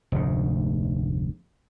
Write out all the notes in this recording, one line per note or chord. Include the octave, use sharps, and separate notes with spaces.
F1 D2 G#2